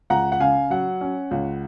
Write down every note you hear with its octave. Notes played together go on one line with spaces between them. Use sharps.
C#2 F#5 A#5
F#5
C#3 F5 G#5
F#3 F#5
C#4
C#2